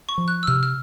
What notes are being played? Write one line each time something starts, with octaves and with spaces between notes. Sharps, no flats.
C#6
F3
F#6
E6
C3 F6
F6